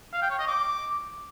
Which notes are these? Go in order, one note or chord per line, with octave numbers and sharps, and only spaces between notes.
F5
G5
C#5
D#5
D6